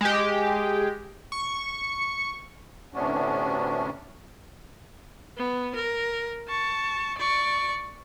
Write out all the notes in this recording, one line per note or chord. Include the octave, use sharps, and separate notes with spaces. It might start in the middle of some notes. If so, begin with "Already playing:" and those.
G#3 G4
C#6
D2 A2 C3 B3 C#4 D4
B3
A#4
A5 C#6
D5 C#6